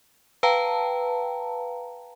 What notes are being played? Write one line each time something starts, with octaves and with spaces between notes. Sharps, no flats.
B4 F5 G5 A5 A#5